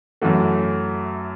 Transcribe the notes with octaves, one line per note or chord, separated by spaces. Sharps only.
F#2 E3 A3 F#4